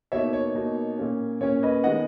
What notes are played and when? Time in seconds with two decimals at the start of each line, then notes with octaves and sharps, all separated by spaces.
0.12 B2 A#3 D#4 C#5 E5
0.33 C#5
0.55 B2 A#3 D#4
0.98 A#2 A#3 C#4
1.41 A#2 A#3 C#4 C#5
1.63 B4 D#5
1.84 D#3 G#3 B3 D#4 D#5 F#5